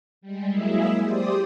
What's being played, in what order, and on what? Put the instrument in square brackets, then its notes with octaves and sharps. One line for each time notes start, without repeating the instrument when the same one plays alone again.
[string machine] G3 G#3
F#3 G#3 A#3 E4 G#4 E5
G4 C5 D5 D#6